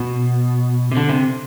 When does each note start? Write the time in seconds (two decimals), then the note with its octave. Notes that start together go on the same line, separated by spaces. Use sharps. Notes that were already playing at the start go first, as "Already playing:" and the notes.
Already playing: B2
0.92 C3
0.95 D3
1.09 C3